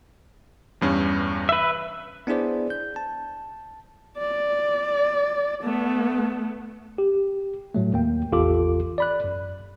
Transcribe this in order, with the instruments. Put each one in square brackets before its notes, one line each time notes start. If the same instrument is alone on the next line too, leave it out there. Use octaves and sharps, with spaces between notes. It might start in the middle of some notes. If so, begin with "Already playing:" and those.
[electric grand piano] E2 G2 C#4
[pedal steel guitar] B4 E5
[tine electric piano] B3 D4 E4 G#4 C5 D5
G6
A5
[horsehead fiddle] D5
A3 B3
[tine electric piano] G4
A2 F#3 A3
D#2 A#3 G5
A1 E2 F4 G4 A4 D6
D5 B5 F#6
F#2